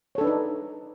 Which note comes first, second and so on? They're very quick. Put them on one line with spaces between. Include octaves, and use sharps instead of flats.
C#5 A4 D4 B4 D#4